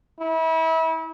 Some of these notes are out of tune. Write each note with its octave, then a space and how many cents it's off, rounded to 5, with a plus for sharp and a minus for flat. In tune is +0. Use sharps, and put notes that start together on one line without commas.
E4 -35